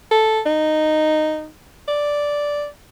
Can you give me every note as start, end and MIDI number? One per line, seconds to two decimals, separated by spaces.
0.11 0.40 69
0.46 1.49 63
1.88 2.67 74